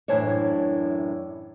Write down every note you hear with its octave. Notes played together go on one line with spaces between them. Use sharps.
F#2 A2 E3 D4 C5 C#5